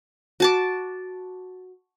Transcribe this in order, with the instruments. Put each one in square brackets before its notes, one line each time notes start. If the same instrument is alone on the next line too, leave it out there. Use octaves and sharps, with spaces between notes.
[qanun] F#4 A5 D6